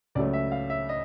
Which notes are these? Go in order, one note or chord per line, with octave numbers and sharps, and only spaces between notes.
C#2 C#3 F#3 A3 D5
E5
F5
E5
D#5